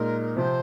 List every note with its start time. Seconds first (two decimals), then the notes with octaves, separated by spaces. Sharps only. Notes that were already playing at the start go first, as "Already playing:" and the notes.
Already playing: A#2 G#3 D#4 A#4
0.36 C3 F3 C4 C5